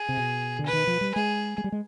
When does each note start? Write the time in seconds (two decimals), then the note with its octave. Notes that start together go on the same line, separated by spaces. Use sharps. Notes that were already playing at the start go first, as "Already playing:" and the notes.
Already playing: G#4
0.09 C3
0.17 B2
0.59 D3
0.66 B4
0.73 D#3
0.87 F3
1.01 G3
1.15 G#3 G#4
1.58 G#3
1.64 G3
1.72 G#3